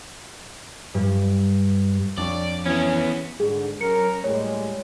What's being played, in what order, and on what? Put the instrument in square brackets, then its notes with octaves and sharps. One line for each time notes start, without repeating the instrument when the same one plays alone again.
[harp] G2
[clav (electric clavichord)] F2 D4 C#5 [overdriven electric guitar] D5
[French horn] E3 [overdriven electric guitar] B3 G#4 [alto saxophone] C#4
[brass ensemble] G#2 D3 [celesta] G#4
[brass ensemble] F#3 C#4 A#4 [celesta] C#7
[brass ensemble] A2 G3 G#3 [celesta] C#5